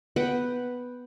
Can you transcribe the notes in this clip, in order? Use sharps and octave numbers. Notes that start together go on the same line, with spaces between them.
B3 B4 F#5 G5